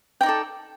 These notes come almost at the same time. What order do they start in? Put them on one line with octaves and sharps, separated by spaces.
G5 D#4 D5 A4